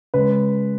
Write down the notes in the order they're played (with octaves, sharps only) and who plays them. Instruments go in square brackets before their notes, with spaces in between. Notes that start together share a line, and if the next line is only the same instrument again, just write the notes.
[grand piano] C#3 G#3 B4